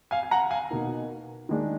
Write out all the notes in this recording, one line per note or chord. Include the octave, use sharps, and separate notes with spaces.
F5 G#5
G#5
F#5 A#5
F5 G#5
B2 A#3 D#4
D#3 G#3 D4